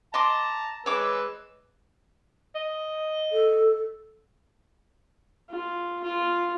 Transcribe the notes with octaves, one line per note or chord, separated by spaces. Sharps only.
D#5 A5 A#5 C6 D6
G#3 B4 C#5 D6 E6
D#5
A4
F4
F4